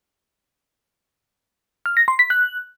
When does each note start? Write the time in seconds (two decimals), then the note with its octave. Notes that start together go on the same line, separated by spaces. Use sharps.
1.86 F6
1.97 A#6
2.08 C6
2.19 B6
2.30 F#6